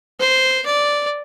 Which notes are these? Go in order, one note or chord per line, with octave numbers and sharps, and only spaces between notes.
C5
D5